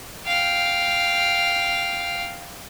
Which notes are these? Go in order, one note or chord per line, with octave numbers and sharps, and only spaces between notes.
F5 G5